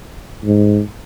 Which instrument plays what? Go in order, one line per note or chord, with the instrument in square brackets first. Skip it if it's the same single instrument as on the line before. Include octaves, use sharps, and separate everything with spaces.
[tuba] G#2